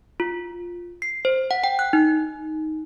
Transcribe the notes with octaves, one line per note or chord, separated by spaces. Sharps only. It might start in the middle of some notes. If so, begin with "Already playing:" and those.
F4
C7
C5
F#5
G5
F#6
D#4